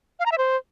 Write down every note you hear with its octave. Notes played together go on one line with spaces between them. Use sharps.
F5
A#5
E5
C5